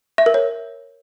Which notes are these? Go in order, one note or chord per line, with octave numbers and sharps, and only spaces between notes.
E5
A#4
C#5